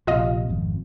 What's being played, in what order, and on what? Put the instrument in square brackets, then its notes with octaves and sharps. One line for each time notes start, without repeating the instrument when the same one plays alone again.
[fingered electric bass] A#1 C3 [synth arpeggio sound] F4 D#5 F5
[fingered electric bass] G#1 F2